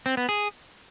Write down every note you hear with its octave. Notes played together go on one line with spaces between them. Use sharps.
C4
B3
G#4